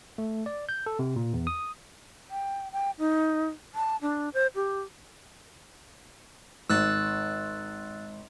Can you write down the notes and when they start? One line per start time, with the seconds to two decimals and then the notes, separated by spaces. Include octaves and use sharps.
0.18 A3
0.46 D5
0.69 G6
0.86 A4
0.99 C3
1.16 A#2
1.34 E2
1.47 D#6
2.31 G5
2.72 G5
2.99 D#4
3.75 A5
4.02 D4
4.34 C5
4.55 G4
6.70 G#1 E6 F#6 A6